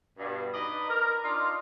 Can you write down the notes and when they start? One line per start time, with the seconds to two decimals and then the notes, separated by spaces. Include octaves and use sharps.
0.17 G2 B2
0.54 D#4 B4 D5 D#5
0.89 A#4
1.24 D4 D#4 F4